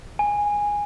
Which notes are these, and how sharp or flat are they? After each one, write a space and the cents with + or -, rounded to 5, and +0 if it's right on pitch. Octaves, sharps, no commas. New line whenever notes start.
G#5 -10